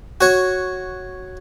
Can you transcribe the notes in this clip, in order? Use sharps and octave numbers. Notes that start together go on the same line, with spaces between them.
F#4 C#5